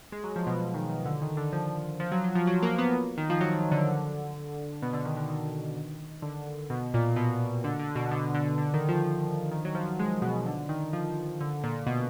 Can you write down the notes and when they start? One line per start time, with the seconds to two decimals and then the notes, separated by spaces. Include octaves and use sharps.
0.12 G#3
0.24 F#3
0.36 F3
0.47 B2
0.59 B2
0.74 D#3
0.90 D#3
1.06 D3
1.22 D#3
1.37 D3
1.53 F3
2.00 F3
2.12 F#3
2.24 F#3
2.35 F3
2.47 F#3
2.63 A#3
2.78 B3
3.17 D#3
3.30 F3
3.41 F#3
3.72 D3
4.82 B2
4.93 D3
5.05 D#3
5.17 D3
5.29 D#3
6.22 D3
6.70 B2
6.94 A#2
7.16 B2
7.64 D3
7.79 D3
7.96 B2
8.11 D3
8.34 D3
8.58 D3
8.74 D#3
8.89 F3
9.51 D#3
9.65 F#3
9.75 F3
9.99 G#3
10.22 B2
10.46 D3
10.69 D#3
10.93 F3
11.41 D3
11.64 A#2
11.76 A#2
11.87 B2